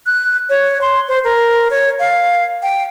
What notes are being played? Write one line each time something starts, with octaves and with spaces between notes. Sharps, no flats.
F#6
C#5
C6
C5
A#4
C#5
F5
G5